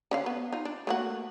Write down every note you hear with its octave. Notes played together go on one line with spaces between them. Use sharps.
D3 C#4 F5
B3
D#4 F4
D4
A3 A#3 F#4